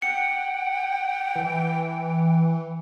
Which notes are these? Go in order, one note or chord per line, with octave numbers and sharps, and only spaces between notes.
F#5 G5 C#7
E3